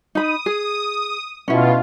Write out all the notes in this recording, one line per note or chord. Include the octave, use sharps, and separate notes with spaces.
D#4 B5 D#6
G#4
B2 C#4 E4 F4